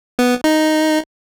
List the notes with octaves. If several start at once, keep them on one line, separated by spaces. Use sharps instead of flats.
B3
D#4